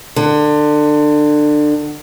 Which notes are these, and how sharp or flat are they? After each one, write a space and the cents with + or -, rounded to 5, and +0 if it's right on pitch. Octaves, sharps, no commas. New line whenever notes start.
D3 +25